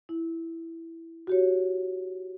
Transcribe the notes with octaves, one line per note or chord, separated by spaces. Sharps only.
E4
F#4 G4 C#5